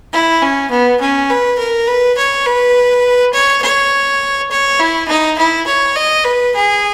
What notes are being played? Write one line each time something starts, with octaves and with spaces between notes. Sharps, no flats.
E4
C#4
B3
C#4
B4
A#4
B4
C#5
B4
C#5
C#5
C#5
E4
D#4
E4
C#5
D#5
B4
G#4